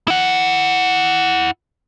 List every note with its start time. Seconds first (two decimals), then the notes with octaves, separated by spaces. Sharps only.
0.08 E4 F#5